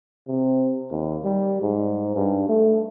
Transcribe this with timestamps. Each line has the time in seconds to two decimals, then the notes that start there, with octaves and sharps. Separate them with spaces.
0.28 C3
0.90 D#2
1.24 G3
1.62 G#2
2.16 G2
2.49 A3